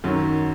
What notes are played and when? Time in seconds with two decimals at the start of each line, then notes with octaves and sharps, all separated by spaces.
0.04 F#2 D#3 F#3